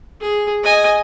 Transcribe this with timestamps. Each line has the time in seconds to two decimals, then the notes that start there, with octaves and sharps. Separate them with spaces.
0.21 G#4
0.63 D#5 G#5